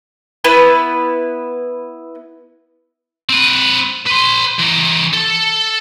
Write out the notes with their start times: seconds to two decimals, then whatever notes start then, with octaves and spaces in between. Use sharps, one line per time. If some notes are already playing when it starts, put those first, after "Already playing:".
0.44 B3 E4 B4
3.30 C4 B4
4.07 B4 C6
4.59 E3 A#4
5.13 A4